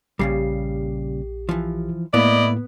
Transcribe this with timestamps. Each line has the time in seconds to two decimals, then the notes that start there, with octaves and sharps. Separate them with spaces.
0.19 A#1 A#2 C#3 G3 G4 C7
1.49 E3 F3
2.14 A2 A#3 B3 E4 D5 D#5